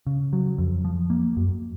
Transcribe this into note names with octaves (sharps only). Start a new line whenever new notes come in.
C#3
F#3
F2
F3
A#3
F#2